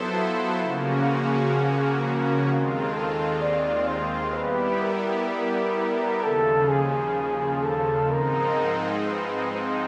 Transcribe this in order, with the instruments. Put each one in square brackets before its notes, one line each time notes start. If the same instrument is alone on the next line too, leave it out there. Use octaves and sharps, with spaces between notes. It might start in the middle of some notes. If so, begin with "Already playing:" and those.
Already playing: [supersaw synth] F#3 B3 E4 A4 C5
[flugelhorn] F4
[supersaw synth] C#3 F3 A#3 C#4 F#4
[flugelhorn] G#4
A#4
[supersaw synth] D#2 D#3 G#3 C4 F4
[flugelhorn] A4
D5
C5
[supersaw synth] G3 B3 E4 G4 [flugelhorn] B4
[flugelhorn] A#4
A#4
[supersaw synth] D#2 C#3 F3 [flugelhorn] A4
[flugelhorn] G#4
A4
[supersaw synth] G#2 F3 G#3 C4 D#4 [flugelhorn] A#4
[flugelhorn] B4
C5